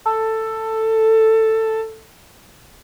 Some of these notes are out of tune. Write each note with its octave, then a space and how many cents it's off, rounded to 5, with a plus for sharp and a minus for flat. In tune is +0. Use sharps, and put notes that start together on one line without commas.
A4 +10